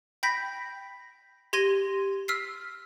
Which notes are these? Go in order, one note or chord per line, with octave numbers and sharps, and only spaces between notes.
G5 B5 G6 A#6 B6
G4 C6 G#6 A#6 D#7 G7
E6 F6 B6 C7